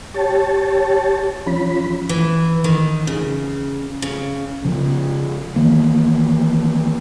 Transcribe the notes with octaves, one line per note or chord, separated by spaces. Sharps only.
G4 C#5 A5
F3 C#4 B5
E3
D#3
C#3
C#3
C#3 F3
D#3 E3 A#3